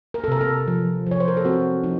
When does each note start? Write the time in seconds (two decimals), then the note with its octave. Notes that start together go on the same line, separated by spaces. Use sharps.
0.14 A#4
0.24 A4
0.28 C3 A#4
0.41 A4
0.67 F3
1.07 F3 C#5
1.20 C5
1.28 A#4
1.37 A4
1.45 C4 F#4
1.83 F3 D#4